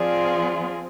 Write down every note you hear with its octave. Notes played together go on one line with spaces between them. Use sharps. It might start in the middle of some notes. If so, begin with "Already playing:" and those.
Already playing: F3 C4 F4 G#4 D5